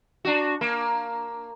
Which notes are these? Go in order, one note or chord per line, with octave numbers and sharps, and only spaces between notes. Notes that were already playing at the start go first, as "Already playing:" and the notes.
D4 F#4
A#3